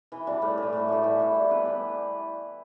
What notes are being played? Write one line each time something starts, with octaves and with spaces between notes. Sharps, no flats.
E3
G3 D4
A2
E3 A3
A2
G3 D4 G4
E3
G3 E4
G3
B3 D4 B4
E3